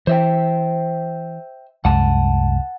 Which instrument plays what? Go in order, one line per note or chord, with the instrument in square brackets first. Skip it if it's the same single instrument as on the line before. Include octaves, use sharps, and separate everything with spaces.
[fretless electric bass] E3 [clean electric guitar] C5 E5 G5
[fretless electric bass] C2 F#2 G#3 [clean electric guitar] F#5 A5